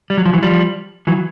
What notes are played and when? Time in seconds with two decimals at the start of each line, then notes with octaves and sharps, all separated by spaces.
0.10 G3
0.18 F#3
0.25 F3
0.33 E3 F#3
0.42 F3 G3
1.07 E3 F#3